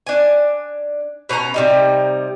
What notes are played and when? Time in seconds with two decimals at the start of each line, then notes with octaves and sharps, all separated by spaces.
0.07 D4 G#5
1.29 B2 C#4 A4 A#5
1.54 C3 G3 D#4